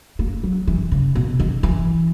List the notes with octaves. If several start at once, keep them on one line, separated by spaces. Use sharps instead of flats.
A#3
F#3
E3
C#3
B2
D#3
E3